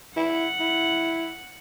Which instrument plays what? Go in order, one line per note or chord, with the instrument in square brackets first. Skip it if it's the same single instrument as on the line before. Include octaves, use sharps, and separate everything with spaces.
[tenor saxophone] E4 [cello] F#5
[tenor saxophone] E4